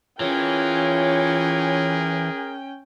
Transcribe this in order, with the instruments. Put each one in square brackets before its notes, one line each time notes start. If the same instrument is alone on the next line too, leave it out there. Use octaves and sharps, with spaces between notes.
[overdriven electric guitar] E3 [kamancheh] C#4 G5 [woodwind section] F4 C#5 [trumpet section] G#4 A#4